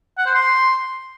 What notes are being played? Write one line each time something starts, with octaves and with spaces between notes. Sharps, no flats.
F#5
C5
C6